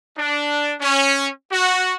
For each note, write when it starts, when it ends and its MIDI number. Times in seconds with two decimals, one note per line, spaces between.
0.17 0.73 62
0.80 1.27 61
1.51 1.94 66